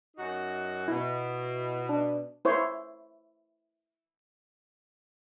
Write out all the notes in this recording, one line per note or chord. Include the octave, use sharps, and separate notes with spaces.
F#2 D#4 F#4
B2 E4
D4
E4 C5 C#5